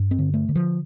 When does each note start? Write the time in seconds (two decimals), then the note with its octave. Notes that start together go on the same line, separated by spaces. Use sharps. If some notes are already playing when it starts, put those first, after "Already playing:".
Already playing: G2
0.11 C4
0.19 D3
0.34 A3
0.49 D3
0.56 F3